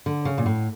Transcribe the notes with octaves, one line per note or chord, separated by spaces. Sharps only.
D3
C#3
A#2
A2